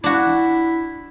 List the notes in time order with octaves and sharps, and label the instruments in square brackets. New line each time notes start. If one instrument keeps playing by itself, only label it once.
[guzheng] D4 F#4 [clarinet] E4